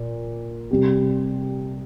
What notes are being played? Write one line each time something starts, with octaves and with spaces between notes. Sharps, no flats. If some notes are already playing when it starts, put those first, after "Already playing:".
Already playing: A#2
C3 G3 C4 G4